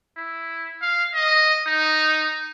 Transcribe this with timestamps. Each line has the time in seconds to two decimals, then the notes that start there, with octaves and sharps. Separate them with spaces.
0.17 E4
0.82 F5
1.15 D#5
1.67 D#4